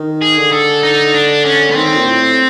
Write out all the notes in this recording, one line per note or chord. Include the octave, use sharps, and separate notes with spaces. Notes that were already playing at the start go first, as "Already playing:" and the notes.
Already playing: D#3
G#4
D3
A4
D#4
D4
C#4
D3 B3
D#3 C4
A#2
A2